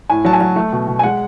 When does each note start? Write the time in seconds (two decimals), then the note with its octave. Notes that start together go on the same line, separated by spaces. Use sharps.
0.10 A2 G#5
0.25 F#3 A5
0.33 G#5
0.40 F#3
0.56 A3
0.72 B2
0.87 B2
0.99 G#5
1.03 G#3 F#5